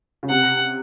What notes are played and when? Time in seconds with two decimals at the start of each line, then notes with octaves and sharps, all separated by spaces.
0.23 C#3
0.29 C3 F#5